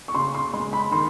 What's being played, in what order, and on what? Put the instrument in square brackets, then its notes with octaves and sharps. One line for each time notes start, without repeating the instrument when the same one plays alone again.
[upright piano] C#6
[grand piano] C#3 [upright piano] C6
[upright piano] C6
[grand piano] G#3 [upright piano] C6
[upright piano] B5
[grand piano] D#3 [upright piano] C6